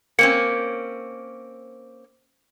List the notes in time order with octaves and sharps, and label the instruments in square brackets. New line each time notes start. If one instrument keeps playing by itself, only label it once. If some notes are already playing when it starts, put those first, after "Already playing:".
[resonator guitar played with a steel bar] A#3 C4 C#4 [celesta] C#7